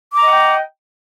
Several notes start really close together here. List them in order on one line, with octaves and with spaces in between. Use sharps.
D6 A#5 D#5 F#5 G5